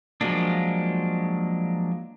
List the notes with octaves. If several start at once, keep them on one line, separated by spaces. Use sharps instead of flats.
F3 F#3 G#3 A#3 D4